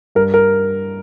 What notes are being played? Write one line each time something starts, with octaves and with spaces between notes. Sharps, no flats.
G2 A#4
A#4